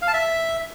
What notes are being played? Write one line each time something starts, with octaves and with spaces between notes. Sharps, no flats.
F5
A5
E5